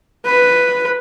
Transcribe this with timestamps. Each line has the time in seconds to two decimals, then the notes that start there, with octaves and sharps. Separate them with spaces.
0.25 B4